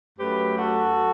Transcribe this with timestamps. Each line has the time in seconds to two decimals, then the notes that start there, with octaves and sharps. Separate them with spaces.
0.19 F#2 F#3 A3 G4 B4
0.57 F#4 A4